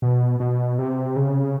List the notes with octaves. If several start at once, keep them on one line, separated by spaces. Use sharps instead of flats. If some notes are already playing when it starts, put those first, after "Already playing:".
B2
B2
C3
C#3